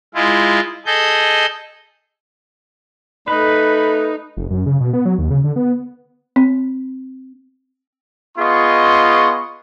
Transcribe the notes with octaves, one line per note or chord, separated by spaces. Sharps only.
G#3 E4 F4
G#4 A4 D#5 G6
A3 D#4 B4 B5
F1
F#2
C#3
B2
B3
F#3
D#2
C#3
D3
B3
C4
B3 F4 G#4 D#5 C6 C#6